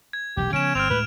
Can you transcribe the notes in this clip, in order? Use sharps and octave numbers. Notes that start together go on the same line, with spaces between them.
G#6
E1 B1 A#2 G4
C#3 F3 B3 C#4 D7 E7
G1 C4 F6 D7 F7
D2 A2 G#3 B4